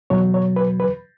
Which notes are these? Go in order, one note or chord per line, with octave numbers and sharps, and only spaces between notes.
E2 B2 F#3 C#5
C#5
B4
B4